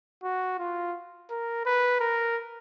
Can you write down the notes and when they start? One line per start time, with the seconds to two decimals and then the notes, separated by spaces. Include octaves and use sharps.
0.23 F#4
0.59 F4
1.30 A#4
1.66 B4
2.00 A#4